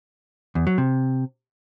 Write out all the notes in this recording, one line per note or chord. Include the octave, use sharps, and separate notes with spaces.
E2
F#3
C3